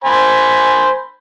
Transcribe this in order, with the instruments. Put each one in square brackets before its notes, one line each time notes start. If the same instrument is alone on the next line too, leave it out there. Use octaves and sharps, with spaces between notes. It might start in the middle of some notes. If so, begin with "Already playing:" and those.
[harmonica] C5 G#5 B5